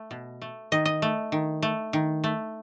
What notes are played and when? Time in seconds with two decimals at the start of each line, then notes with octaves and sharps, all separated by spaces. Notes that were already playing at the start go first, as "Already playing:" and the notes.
Already playing: A3
0.11 B2
0.42 A3
0.72 D#3 D#5
0.85 D#5
1.02 A3
1.32 D#3
1.62 A3
1.93 D#3
2.24 A3